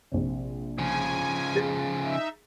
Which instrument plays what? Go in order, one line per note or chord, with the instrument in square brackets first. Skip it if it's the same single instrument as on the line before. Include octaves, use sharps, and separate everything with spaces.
[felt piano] A#1 C3
[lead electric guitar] C#3 F3 [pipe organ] G#5
[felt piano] G#4 A6
[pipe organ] D#4 E5